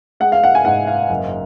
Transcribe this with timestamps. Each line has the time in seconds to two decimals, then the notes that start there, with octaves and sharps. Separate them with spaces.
0.20 G#3 F#5
0.32 F5
0.44 F#5
0.55 G#5
0.65 G#2 F#5
0.87 F5
1.10 F#1